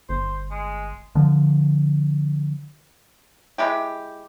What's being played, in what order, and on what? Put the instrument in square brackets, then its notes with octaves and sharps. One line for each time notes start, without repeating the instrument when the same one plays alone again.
[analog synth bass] G1 [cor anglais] C5
[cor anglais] G#3
[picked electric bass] D3 F3
[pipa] G#3 E4 G4